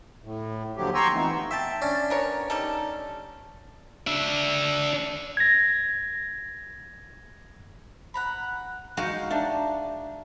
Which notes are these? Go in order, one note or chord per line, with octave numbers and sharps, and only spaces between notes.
A2
D#2 D3 F3 F#3 G4
G5 G#5 A#5 C6 C#6 E6
E3 F3 A3 B3 C4 D#4
E5 G5 A5
C#4 D4
B3 A#4 C#5
G3 D#4 A4
D4 E5
G#6 A#6
F#5 A#5 B5
G#3 D#4 F#4 F5 G6
D4 E5 A5 A#5